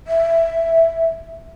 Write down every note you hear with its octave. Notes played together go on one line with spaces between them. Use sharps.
E5